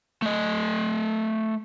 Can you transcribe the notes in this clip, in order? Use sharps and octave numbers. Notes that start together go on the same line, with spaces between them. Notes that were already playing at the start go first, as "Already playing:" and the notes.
A3 D#5